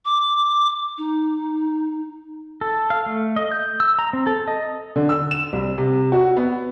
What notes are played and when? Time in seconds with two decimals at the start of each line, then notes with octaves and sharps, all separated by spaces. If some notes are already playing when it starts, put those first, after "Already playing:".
0.05 D6
0.98 D#4
2.61 A4
2.90 F5
3.06 A3
3.36 D#5
3.52 G6
3.80 E6
3.99 A#5
4.13 C4
4.27 A4
4.48 D#5
4.96 D3
5.09 E6
5.31 E7
5.53 C2
5.78 C3
6.12 F#4
6.37 B3